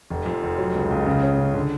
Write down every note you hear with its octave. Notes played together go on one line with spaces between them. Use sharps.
F1
F2
F1
F#3
C#2
C#2
C#3
C#4
C#3
D3